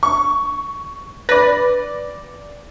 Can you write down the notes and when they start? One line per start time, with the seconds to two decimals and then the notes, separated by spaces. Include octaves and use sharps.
0.03 C#6
1.29 B4 D5 A#6